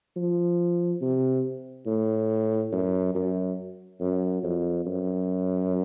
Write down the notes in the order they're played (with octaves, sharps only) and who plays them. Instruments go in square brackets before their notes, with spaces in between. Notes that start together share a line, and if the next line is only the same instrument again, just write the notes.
[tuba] F3
C3
A2
F#2
F#2
F#2
F2
F#2